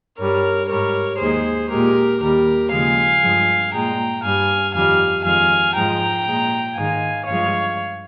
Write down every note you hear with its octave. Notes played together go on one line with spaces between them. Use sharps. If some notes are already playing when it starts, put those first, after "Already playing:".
G2 G3 A#4 C#5
G#2 G3 A#4 C#5
D#2 D#3 G#3 G#4 C5
A#2 G#3 G4 A#4
D#2 D#3 G3 G4 A#4
D#2 C#3 F3 G#3 F5 G#5
G2 F3 G#3
A#2 G#3 G5 A#5
G2 G3 F5 G#5
F2 D#3 G3 F5 G#5
F2 D#3 G#3 F5 G#5
G#2 F3 G#3 G5 A#5
A#2 G#3
G#2 D#3 G#3 F5 G#5
G2 F3 G#3 C#5 F5